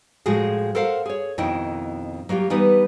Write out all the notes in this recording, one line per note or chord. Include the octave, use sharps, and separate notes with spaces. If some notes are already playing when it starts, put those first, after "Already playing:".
A2 F3 G#3 F4 F#4 G#4
A4 A#4 C5 F5 F#5
G#4 C#5
F2 B2 D#3 D#4 E4 G5
F#3 A#3 F4 G4
E3 G3 B3 D#4 B4